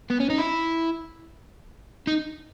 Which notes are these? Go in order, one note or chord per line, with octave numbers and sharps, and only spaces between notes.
B3
C#4
D#4
E4
D#4